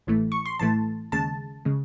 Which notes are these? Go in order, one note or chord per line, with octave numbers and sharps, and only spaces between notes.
A1 A2 E3 A3
C#6
C6
A1 A2 E3 A3 A5
D#2 C#3 G#3 A5
C#3 G#3